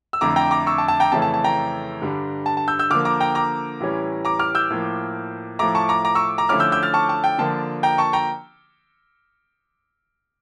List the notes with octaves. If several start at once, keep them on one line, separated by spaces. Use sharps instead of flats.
E6
F2 D3 A3 E4 A#5 D6
G5 A#5
A#5 D6
C#6 E6
A5
A5
G5 A#5
F2 C#3 E3 A3 C#4 A5
A5
A5
G5 A#5
G2 D3 G3 D4
A5
A5
E6 G6
E6 G6
D3 F3 A#3 D6 F6
A#5 D6
G5 A#5
A#5 D6
A2 E3 G3 C#4
A#5 D6
D6 F6
E6 G6
A2 F3 A#3
A2 F3 A3 A#5 D6
A5 C#6
A#5 D6
A#5 D6
C#6 E6
A#5 D6
D3 F3 A3 C#4 E4 D6 F6
E6 G6
E6 G6
F6 A6
A5 C#6
A5
G5
D3 F3 A#3 D4 F4 A5
G5 A#5
A5 C#6
G5 A#5